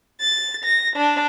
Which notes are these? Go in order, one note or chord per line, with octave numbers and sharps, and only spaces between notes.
A6
A#6
D4